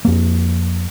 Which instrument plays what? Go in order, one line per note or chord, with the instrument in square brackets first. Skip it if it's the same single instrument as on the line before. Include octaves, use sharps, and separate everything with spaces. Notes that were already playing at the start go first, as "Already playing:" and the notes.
[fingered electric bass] F2 A#3